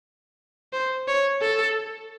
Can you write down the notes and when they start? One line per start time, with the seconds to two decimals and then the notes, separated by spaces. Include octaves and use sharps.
0.73 C5
1.08 C#5
1.42 A4